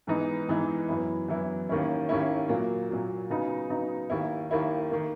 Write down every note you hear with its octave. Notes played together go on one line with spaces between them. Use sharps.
G#2 E3 B3 D#4
G#2 E3 B3 D#4
F#2 E3 B3 E4
F#2 E3 B3 E4
D#2 D#3 A#3 C#4 E4
D#2 D#3 A#3 C#4 E4
A#2 F#3 A#3
A#2 F#3 A#3
C#3 F#3 B3 D#4
C#3 F#3 B3 D#4
D#2 D#3 A#3 E4
D#2 D#3 A#3 E4
D#3 A#3